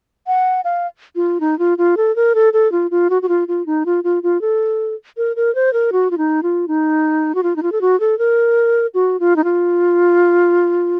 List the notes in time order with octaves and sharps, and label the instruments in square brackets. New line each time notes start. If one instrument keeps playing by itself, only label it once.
[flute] F#5
F5
F4
D#4
F4
F4
A4
A#4
A4
A4
F4
F4
F#4
F#4
F4
F4
D#4
F4
F4
F4
A4
A#4
A#4
C5
A#4
F#4
F4
D#4
F4
D#4
F#4
F4
D#4
F4
A4
F#4
A4
A#4
F#4
F4
D#4
F4